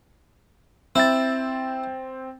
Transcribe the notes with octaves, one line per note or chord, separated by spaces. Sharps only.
C4 E4 G5 A6